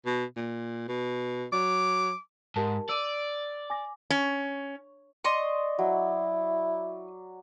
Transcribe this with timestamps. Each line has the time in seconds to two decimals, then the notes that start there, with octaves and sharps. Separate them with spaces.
0.06 B2
0.37 A#2
0.88 B2
1.53 F#3 D6
2.56 G#2 G4 A#4 A5
2.89 D5 E6 D#7
3.70 G#5 D6 A#6
4.10 C#4
5.24 D5 D#5 C6 C#6
5.79 F#3 E4